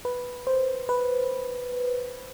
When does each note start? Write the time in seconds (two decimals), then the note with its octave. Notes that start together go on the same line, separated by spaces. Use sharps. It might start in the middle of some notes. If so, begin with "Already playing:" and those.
0.05 B4
0.47 C5
0.89 B4